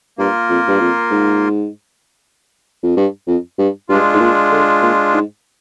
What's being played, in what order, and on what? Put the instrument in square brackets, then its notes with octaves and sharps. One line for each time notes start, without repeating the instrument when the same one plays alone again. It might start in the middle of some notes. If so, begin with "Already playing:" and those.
[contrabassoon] G2 [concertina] A#3 F4 A#4
[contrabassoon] F2
G2
F2
G#2
F2
G2
F2
G2
[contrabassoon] G2 [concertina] G#3 D4 F4
[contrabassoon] G#2
A#2
D3
A#2
G#2